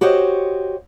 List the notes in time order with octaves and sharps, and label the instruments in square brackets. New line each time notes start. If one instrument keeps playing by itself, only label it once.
[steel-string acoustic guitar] F#4 G4 C5 C#5 D#5